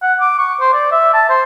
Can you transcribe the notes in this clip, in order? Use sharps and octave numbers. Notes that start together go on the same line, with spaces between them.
F#5
D6
C#6
C5
D5
E5
A5
C5